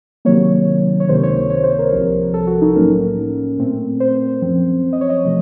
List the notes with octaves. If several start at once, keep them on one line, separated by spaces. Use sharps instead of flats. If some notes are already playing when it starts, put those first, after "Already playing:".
C3 D#3 F#3 A#3 C#5
C#5
C#2 C3 D#3 A#3 C5
C#5
C#5
C#5
C5
A#4
C2 C3 F3
A4
F#4
D#4
A2 F#3 A#3 C#4 A#4
A#2 A3 C4
C5
F#2 F3 C4
D#5
C#5
D#5
C3 F3 A3 D#5